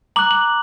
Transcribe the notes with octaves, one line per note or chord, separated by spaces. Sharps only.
A#5 D6 F#6 F#7
F#7